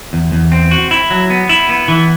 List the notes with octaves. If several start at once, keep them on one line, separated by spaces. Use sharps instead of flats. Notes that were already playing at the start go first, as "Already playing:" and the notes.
E2
E2
C4
F#4
E4
F#3
B3
E4
B3
E3